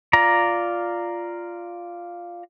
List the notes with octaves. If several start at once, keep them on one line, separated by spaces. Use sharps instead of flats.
F4 D5 A#5